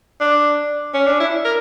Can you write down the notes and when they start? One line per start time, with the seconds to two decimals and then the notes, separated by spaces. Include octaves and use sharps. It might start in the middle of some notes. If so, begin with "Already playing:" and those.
0.20 D4
0.94 C#4
1.06 D4
1.20 E4
1.45 A#4